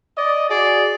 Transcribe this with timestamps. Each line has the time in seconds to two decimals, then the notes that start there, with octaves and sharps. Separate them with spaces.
0.17 D5 D#5
0.50 F#4 G#4 D5